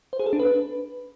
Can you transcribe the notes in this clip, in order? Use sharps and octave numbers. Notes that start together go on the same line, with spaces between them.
C5
G#4
A4
D4
B4